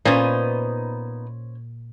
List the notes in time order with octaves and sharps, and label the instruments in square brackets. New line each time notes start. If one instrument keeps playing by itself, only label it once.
[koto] A#2 [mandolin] B3 D#4 [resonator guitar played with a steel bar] C#4 C5